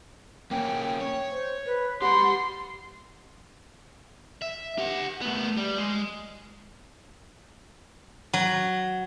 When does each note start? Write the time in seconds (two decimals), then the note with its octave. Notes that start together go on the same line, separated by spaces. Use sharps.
0.51 A#3 C#4 G5
1.01 C#5
1.31 C5
1.66 B4
2.02 G4 F#5 B5 C6
4.42 E5
4.78 G4 F#5
5.21 A3 B3
5.57 G3
5.78 G#3
8.33 F#3